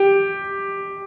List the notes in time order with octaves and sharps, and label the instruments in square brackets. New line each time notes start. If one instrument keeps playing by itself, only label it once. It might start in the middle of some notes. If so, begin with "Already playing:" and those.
Already playing: [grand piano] G4